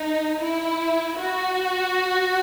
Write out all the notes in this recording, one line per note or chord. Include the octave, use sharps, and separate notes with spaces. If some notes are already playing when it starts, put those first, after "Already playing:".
Already playing: D#4
E4
F#4